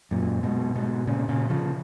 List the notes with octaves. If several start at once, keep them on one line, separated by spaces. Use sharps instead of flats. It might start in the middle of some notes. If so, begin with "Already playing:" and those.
F#2 A#2
G#2 B2
G#2 B2
A#2 C#3
A#2 C#3
C#3 F3